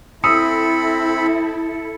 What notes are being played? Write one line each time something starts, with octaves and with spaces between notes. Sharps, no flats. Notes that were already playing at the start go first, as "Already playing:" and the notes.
C4 E4 A4 B5 D#6 E6 C#7